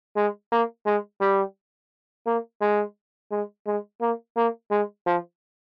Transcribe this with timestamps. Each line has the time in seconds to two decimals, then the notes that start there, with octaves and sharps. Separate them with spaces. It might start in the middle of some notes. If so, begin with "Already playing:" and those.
0.16 G#3
0.52 A#3
0.86 G#3
1.21 G3
2.26 A#3
2.61 G#3
3.31 G#3
3.67 G#3
4.01 A#3
4.37 A#3
4.71 G#3
5.06 F3